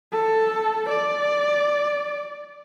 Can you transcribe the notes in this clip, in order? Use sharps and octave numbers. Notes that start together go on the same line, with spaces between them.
A4
D5